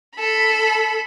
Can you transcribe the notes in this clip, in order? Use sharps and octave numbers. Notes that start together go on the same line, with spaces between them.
A4 B5